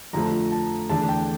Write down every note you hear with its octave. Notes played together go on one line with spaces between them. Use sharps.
F2 D3 F3 A3 A#5
A5
E2 D3 A3 D4 A5
G5